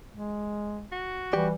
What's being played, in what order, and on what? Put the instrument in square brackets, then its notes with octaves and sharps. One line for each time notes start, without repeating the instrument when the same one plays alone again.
[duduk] G#3
[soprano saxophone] F#4
[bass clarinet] E3 [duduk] G3 [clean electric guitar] G4 D5